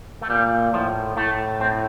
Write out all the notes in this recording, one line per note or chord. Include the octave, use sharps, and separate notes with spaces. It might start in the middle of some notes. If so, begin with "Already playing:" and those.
A3
A#2 G3
A2 F3
A2 A3
C4